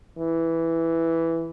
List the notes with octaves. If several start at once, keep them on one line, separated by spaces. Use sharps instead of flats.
E3